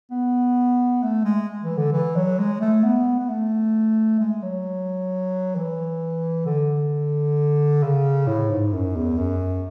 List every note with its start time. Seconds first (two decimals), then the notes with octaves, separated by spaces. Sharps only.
0.11 B3
1.03 A3
1.24 G#3
1.63 E3
1.77 D3
1.93 E3
2.16 F#3
2.39 G#3
2.61 A3
2.84 B3
3.20 B3
3.29 A3
4.20 G#3
4.42 F#3
5.56 E3
6.46 D3
7.83 C#3
8.27 A2
8.50 G#2
8.73 F#2
8.96 E2
9.18 F#2